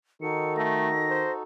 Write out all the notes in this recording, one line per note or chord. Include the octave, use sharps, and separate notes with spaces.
D#3 D#4 F#4 A4 C#7
A3 A#6
C5